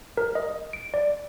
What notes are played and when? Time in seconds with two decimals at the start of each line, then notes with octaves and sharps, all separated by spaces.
0.17 A#4
0.35 D#5
0.73 D7
0.94 D5